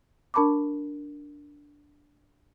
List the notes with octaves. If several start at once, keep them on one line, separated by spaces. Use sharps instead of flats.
D4 A#4 A5 B5 C#6 D6